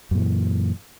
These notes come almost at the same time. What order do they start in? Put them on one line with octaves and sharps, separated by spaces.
F#2 A#2 E3